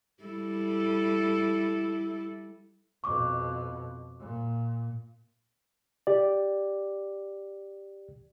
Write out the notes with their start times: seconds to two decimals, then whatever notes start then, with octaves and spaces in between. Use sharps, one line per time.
0.23 G3 E4 A4
3.04 F2 B2 C#6 D6
4.20 A#2
6.07 G4 D5